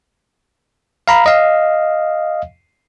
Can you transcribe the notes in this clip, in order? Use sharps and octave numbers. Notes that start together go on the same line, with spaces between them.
F5 A#5 B5
D#5 F5